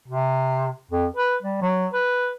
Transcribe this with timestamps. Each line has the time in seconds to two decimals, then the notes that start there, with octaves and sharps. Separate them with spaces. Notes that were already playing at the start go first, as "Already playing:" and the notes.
0.08 C3
0.91 F2
1.16 B4
1.42 G3
1.62 F#3
1.93 B4